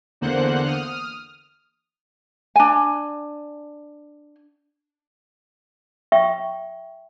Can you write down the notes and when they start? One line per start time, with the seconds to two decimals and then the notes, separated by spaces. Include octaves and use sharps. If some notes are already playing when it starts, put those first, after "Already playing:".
0.21 E2 D3 A#3 C5 F#5 F#6
0.66 D#6 F6
2.56 D4 G#5
6.12 E5 G5 C#6